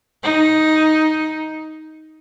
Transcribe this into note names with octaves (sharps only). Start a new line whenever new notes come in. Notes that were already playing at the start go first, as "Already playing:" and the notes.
D#4